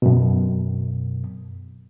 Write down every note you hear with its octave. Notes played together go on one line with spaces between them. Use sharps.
F#2 B2